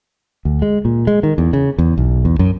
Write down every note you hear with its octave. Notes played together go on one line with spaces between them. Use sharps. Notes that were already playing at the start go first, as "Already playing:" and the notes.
D2
G#3
A#2
G#3
D#3
E2
C#3
E2
B1
E2
F#2